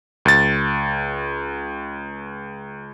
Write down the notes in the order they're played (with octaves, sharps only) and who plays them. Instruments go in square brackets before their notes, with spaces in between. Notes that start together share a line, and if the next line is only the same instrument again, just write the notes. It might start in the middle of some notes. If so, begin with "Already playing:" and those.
[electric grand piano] C#2 A6